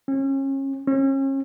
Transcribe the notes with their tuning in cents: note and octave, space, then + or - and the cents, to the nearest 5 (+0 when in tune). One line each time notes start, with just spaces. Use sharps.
C#4 -30
C#4 -35